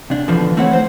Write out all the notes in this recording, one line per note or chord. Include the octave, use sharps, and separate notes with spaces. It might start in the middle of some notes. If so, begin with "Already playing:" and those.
C3 D4
B2 D3 E3 F3
A3 C4 E4 C#5 F#5
C5